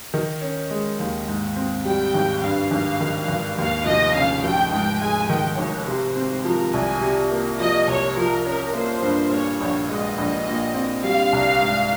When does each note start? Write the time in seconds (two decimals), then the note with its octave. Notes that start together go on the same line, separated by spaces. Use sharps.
0.14 D#3
0.41 C#4
0.70 G#3
0.99 D#2
1.28 G#2
1.56 C4
1.85 G3 G5
2.14 G#1
2.42 G2 F5
2.71 G#1
3.01 D#3
3.28 G#1
3.58 D#2 F5
3.86 F1 D#5
4.15 C#3 F5
4.44 F1 G5
4.72 G#2 G5
5.01 G#3 G#5
5.29 D#3 G5
5.58 G#1 C#5
5.87 C3 C5
6.16 C4
6.44 F3 A#4
6.74 C2 G#5
7.01 C3
7.31 A#3
7.59 F3 D#5
7.87 C2 C#5
8.16 F3 A#4
8.45 C#4 A#4
8.74 A#3 C5
9.02 G2
9.31 A#2 C#5
9.61 A#1 C#5
9.88 G#3 D#5
10.18 A#1
10.46 A#2
10.74 C4
11.03 G3 F5
11.33 C2
11.62 G#2